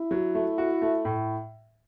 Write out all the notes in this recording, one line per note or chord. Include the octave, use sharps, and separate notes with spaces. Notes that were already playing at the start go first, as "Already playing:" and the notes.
Already playing: E4
F#3
A3
F#4
A3
A2